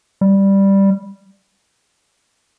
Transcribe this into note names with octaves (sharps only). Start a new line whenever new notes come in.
G3